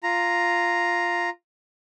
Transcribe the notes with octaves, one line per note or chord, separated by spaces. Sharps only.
F4 A#5